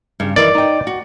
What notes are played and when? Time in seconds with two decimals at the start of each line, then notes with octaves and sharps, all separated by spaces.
0.20 G2 C#3
0.36 D#3 E3 D5
0.54 D#4 G5
0.87 F#4